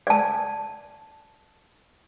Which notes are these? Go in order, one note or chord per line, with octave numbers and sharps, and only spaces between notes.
D5 A5